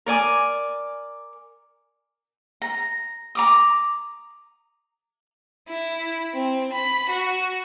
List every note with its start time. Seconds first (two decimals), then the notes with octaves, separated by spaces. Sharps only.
0.06 A#4 D5 G#5 D6
2.62 A#5
3.35 A#5 D6 D#6
5.69 E4
6.34 C4
6.74 B5
7.10 F#4